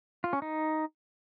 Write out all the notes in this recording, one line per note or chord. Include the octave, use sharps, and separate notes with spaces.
F4
C#4
D#4